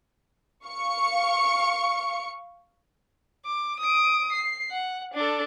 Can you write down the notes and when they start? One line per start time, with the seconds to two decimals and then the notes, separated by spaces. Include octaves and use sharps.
0.65 F5 C#6 C#7
3.46 D6
3.80 D#6 D7
4.32 C7
4.71 F#5
5.14 D4 A4